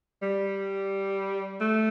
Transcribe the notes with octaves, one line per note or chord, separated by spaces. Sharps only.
G3
A3